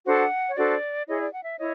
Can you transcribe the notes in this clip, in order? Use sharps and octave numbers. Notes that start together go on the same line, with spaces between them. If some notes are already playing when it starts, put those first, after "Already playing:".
D4 F#4 A4 C5 F#5
C#5
D4 F#4 A4 C5 D5
E4 G#4 C#5 D#5
D5
F#5
E5
E4 C#5 D#5